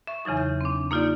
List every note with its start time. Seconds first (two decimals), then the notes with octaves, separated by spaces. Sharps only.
0.07 E5 C#6
0.25 E2 C#3 E3 F#3 D#4
0.37 G6
0.61 C4 D4
0.91 A#3 D#4 F4 G4 D5